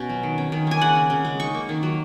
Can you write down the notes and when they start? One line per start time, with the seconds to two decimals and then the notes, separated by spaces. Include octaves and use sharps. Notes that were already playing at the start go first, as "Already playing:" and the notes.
Already playing: B2 C#4
0.09 F#3
0.23 D#3
0.38 C#4
0.52 D#3
0.67 A#3 G#5
0.81 C#3 F#5
0.95 C#4
1.10 C#3
1.25 G#3
1.40 D#4 C#6
1.55 A#3
1.69 D#3
1.83 F#3